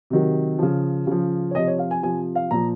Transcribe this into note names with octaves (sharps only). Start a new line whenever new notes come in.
C3 D#3 F#3
C#3 F3
C#3 F3
C#5
C3 F3 D#5
C#5
F5
G#5
C3 F3 G#5
F5
A#2 F3 A#5